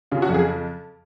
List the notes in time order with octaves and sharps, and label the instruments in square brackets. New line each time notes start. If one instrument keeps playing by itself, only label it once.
[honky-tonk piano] C#3 F4
F#4
F2
G#4